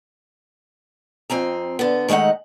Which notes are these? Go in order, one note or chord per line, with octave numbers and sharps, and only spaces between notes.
F2 C4 G#5 A#5
D3 B3
D#3 G#3 A3 D#4 F#5